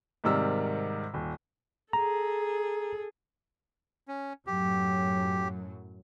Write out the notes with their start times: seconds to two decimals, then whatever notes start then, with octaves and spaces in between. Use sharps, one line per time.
0.24 G#2 C3 D#3 G3 A#4 E6
1.14 D#1
1.93 G#4 A4 A#5
4.08 C#4
4.47 F#2 A2 F#3 G4